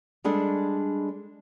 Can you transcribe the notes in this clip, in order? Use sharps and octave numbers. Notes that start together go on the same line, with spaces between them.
G3 G#3 D4 G#4 A4